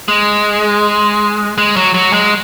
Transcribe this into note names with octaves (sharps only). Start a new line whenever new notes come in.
G#3
G#3
F#3
F#3
G#3